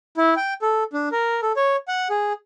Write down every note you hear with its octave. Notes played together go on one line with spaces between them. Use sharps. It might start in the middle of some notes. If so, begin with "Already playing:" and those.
E4
G5
A4
D4
A#4
A4
C#5
F#5
G#4